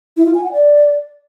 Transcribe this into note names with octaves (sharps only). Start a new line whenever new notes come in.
E4
F4
G#5
F#5
D5